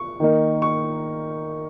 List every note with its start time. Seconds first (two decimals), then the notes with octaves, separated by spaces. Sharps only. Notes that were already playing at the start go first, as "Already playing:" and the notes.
Already playing: C#6
0.20 D#3 A#3 D#4
0.62 C#6